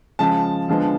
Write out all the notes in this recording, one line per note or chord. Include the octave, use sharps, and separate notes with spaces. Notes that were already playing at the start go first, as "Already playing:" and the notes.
C#3 F3 G#3 A5
D3 F3 G#3 B3